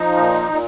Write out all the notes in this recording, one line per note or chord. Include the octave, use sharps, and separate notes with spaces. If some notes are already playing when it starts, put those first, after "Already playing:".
Already playing: F3 D#4
A#2
A#2